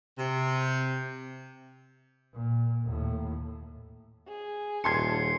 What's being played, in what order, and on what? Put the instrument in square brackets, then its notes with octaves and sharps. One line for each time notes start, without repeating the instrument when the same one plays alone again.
[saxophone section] C3
[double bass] A#2
D#2 A2
[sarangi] G#4
[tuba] D#1 [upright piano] A5 C6 G#6 [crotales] C7 C#7